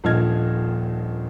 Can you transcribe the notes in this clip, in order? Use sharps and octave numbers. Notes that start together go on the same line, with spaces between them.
D#1 A#1 F3 D#5 F6 G#6